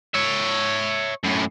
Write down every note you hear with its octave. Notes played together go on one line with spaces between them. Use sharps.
C#5 E5
F#2 A2